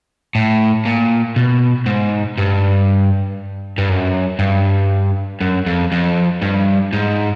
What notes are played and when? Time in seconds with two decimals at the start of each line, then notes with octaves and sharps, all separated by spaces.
0.35 A2
0.86 A#2
1.36 B2
1.86 G#2
2.38 G2
3.78 G2
3.89 F#2
4.39 G2
5.41 F#2
5.66 F2
5.92 F2
6.42 G2
6.93 G#2